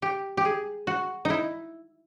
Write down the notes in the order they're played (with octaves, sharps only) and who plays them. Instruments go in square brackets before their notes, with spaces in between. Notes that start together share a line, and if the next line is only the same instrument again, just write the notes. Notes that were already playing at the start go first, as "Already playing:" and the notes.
[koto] G4
G4
G#4
F#4
D#4 E4